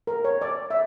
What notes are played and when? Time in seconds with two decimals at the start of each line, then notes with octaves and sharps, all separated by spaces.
0.07 A#4
0.25 C#5
0.42 D5
0.70 E5